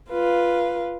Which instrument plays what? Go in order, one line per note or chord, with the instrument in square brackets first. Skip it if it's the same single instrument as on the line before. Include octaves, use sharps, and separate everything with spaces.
[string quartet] F4 B4 F5